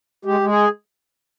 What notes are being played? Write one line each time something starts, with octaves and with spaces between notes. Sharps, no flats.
G#3 G4
G#3
G#4